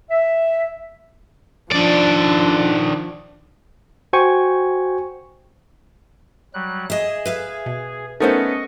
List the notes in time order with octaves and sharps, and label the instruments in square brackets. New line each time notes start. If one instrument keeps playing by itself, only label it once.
[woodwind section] E5
[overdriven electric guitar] D#3 D5 [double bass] F3 D4
[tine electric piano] F#4 C5 G5 G#5 C#6
[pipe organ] F#3 G3 F#6
[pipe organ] G#4 [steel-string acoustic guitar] D#5 E5
[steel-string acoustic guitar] B4 E5 F5
[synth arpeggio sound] B2
[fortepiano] A3 B3 C#4 [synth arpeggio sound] D#4 A#4 C5 [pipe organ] D#5 C#6